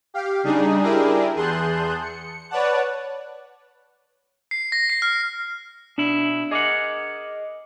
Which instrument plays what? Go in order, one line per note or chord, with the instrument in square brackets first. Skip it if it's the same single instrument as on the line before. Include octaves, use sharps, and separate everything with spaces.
[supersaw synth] G4 F5
C#3 G3 D4 D#4 G#4
D4 E4 G4 G#4 A#4
E2 G#4 A5 C6 F#6 G6
C#7
B4 C#5 D5 F#5 A5 F#6
[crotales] C7
A#6
C7
F6
[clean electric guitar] B2 E4 [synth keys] D4
[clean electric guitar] G#4 A#4 F#5 [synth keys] D#5 D6